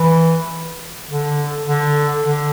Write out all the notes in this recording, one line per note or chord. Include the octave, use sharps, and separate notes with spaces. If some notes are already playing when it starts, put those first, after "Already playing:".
Already playing: E3
D3
D3
D3